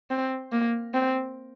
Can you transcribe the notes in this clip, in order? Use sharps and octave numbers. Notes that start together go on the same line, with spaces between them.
C4
A#3
C4